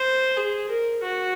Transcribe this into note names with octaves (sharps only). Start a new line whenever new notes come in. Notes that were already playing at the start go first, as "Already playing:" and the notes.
Already playing: C5
G#4
A#4
F#4